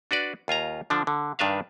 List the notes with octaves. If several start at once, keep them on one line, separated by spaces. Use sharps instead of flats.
D4 F#4 B4 D5
D#2 F4 G#5 A#5
D3 F3 D4
D3
G2 D#3 D4 B4 E5 F5